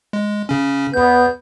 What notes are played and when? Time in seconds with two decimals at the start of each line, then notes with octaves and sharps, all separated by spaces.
0.13 G#3
0.49 C#3 C#4
0.94 E2 B3 G6